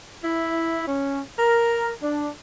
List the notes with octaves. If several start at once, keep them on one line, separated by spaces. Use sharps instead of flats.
E4
C#4
A#4
D4